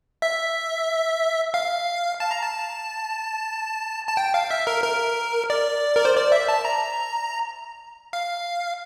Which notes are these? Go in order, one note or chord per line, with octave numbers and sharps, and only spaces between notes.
E5
F5
A5
A#5
A5
A5
G5
F5
E5
A#4
A#4
D5
A#4
C5
D5
E5
A5
A#5
F5